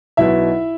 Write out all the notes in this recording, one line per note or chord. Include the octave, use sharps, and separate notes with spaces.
B1 B2 E4 E5